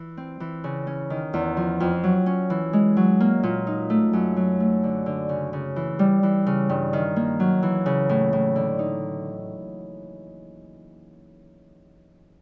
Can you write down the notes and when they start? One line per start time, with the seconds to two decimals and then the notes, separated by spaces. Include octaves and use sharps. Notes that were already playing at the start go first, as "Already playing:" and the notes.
Already playing: E3
0.17 C4
0.40 E3
0.64 C#3
0.87 C#4
1.10 D#3
1.34 E2
1.57 F3
1.80 F2
2.04 F#3
2.26 C#4
2.50 E3
2.73 G#3
2.97 F#3
3.20 A#3
3.43 A#2
3.67 D#4
3.90 A3
4.13 F#2
4.36 F#3
4.60 A3
4.83 D3
5.06 D3
5.29 C#3
5.53 C#3
5.76 E3
5.99 G3
6.23 E3
6.46 C#3
6.69 G2
6.93 D#3
7.16 A#3
7.40 F#3
7.63 E3
7.86 C#3
8.09 A2
8.33 A2
8.56 D3
8.79 D#4